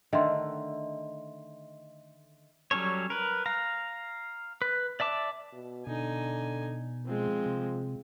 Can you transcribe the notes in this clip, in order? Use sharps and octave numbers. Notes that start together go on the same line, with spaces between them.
D3 D#3 A3 D#5 E5 C6
F#3 G3 C#4 A4 C#5
A#4 B4
F5 A#5
B4
D5 E5 A5 D6
B2
B2 D3 D#4 G#5
F3 G#3 C4
C3